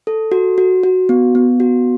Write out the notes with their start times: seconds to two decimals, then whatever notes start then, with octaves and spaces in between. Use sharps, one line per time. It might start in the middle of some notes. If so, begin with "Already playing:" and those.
0.07 A4
0.32 F#4
0.58 F#4
0.83 F#4
1.09 B3
1.35 B3
1.60 F#4